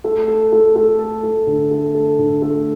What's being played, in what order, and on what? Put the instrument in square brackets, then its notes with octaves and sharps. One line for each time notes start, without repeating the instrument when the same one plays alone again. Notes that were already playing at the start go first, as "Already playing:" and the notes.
[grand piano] A3
A4
A3
A3
A4
A3
D3
A3
A4
D3
A3